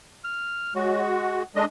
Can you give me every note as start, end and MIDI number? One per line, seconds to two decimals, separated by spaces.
0.24 0.73 89
0.75 1.43 56
0.75 1.43 66
0.75 1.02 73
1.03 1.43 78
1.56 1.65 56
1.56 1.65 62
1.56 1.63 69
1.56 1.65 75